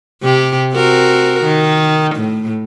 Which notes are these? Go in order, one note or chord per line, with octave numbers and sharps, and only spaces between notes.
C3 G4
C4 F#4 A#4
D#3
A2